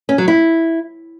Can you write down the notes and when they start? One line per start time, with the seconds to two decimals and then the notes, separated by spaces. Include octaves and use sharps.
0.09 C#4
0.18 F#3
0.28 E4